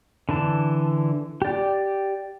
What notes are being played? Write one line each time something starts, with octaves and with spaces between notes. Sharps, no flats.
D3 E3 A5
G4 D5